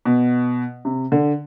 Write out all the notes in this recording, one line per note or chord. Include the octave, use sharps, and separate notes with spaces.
B2
C3
D3